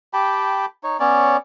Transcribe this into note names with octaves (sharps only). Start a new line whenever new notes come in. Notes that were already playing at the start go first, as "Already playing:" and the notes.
G4 G5 A5 B5
D#4 C#5
B3 C#4 C#5 D5